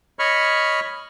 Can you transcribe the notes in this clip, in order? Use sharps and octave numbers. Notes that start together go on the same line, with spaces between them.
C#5 D#5 B5 C#6 F6